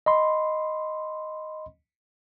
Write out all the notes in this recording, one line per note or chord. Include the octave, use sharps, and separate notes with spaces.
D#5 B5 C6